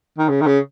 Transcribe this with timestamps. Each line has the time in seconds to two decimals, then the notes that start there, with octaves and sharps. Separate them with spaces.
0.18 D#3
0.29 C#3
0.41 D#3
0.47 C#3